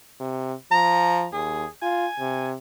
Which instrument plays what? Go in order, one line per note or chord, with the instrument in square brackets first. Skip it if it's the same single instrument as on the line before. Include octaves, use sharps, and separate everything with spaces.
[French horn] C3
[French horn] F3 [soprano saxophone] A#5
[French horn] D#2 [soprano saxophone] G#4
[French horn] F4 [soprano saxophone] G#5
[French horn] C3